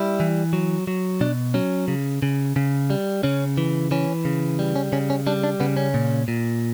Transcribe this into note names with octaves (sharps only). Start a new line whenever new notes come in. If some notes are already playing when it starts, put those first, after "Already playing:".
Already playing: G3 E4
E3
F#3
F#3
B2 D4
F#3 C#4
C#3
C#3
C#3
G3
C#3 C#4
E3
E3 C#4
C#3
G3
C#4
C#3 C#4
C#4
G3 D4
D4
C#3 B3
C#4
A#2
A#2